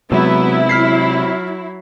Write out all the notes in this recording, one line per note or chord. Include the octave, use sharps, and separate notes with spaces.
C3 F#3 G#3 B3 E4 E5
F#3 F6 B6 C7